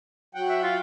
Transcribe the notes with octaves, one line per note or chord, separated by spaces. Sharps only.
F#3 F#5 G5
E5
F4